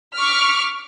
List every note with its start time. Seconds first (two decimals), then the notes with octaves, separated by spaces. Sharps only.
0.14 C#6 D6 F6 B6